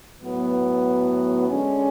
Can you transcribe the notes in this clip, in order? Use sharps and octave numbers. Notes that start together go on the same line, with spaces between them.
A2 F#3 B3
D3 G#3 C#4